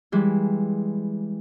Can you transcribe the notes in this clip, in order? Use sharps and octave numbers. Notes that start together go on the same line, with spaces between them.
E3 G3 G#3